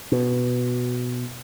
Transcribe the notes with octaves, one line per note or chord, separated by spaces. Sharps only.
B2